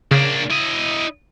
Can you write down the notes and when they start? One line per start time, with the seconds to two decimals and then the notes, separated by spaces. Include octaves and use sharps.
0.11 C#3 A#3 D4
0.50 E4 D#5